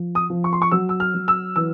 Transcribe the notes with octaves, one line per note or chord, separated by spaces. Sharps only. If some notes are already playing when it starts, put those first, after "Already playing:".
Already playing: F3
D#6
F3
C#6
C6
C#6
F#3 E6
E6
F6
F#3
E6
E3 E6